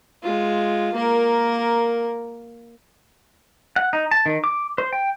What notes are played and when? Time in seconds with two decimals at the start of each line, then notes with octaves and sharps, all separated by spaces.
0.22 G#3 F4
0.94 A#3 A#4
3.76 F#5
3.93 D#4
4.11 A5
4.26 D#3
4.44 D6
4.78 C5
4.93 G5